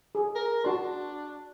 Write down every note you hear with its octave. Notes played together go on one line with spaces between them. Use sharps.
G#4
A#4
D4 F#4 A5 C6